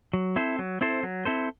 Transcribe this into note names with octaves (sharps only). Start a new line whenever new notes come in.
F#3
C4 E4 A4 C5
F#3
C4 E4 A4 C5
F#3
C4 E4 A4 C5